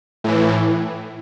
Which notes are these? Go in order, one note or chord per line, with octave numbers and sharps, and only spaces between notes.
A2 E3